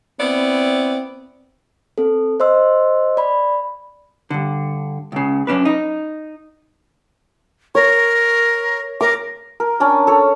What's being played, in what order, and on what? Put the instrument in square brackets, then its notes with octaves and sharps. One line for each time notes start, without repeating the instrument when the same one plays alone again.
[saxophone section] B3 E4 D5 [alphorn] C4
[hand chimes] C4 A4
C5 D#5 C6 E6
D5 B5
[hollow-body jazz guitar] G2 D3
C#2 C#3
F#2 C#4 D4 B4
D#4
[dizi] A#4 [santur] C#5
[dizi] A#4 [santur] D6
[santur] A#4
C#4 D4 D5
A4 C#5